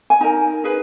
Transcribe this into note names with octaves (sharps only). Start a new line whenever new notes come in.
G#5
D#4 A#4 A#5
D#4 G#4 B4